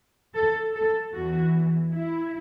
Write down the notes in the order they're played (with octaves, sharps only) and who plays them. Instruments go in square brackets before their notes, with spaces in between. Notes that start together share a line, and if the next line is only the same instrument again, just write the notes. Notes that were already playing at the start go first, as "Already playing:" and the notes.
[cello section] A4
A4
E2 E3 F#4
E4